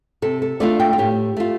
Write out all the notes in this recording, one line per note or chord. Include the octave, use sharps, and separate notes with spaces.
C3 A4
A4
A3 D4 F4 D5
G5
F4
A2 G4
A3 F4